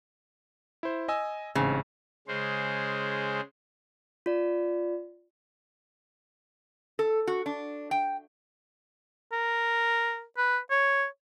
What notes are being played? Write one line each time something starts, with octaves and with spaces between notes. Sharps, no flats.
E4 C5
D#5 G#5 E6
A1 G#2 C#3 C4
C#3 G#3 C5
F4 D5
A4
F#4
D4
G5
A#4
B4
C#5